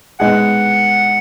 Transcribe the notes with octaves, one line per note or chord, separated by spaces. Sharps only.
G#3 B3 D#4 G#4 F#5